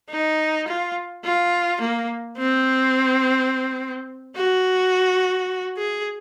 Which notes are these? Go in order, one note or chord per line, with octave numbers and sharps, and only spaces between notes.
D#4
F4
F4
A#3
C4
F#4
G#4